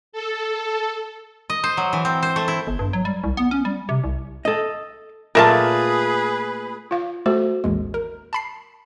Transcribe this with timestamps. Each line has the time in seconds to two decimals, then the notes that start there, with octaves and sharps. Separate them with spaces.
0.13 A4
1.50 D#5
1.64 C5
1.77 F#3
1.93 E3
2.05 C4
2.23 C5
2.36 A3
2.48 E4
2.67 G1
2.79 G2
2.93 F#3
3.05 G3
3.24 C2
3.37 B3
3.51 C#4
3.65 G3
3.89 C3
4.04 C2
4.45 A4 D#5
5.35 A#2 A3 F4 G#4 A#4 B4 E5 A5
6.91 F4 F5
7.26 A3 F#4 A4 C5
7.64 A1 D#2 G#3
7.94 A#4
8.33 A5 B5 C7